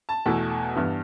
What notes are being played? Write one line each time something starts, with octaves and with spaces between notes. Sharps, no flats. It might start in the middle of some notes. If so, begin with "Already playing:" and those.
A5
E2 B2 A3 E4
G2 E3 B3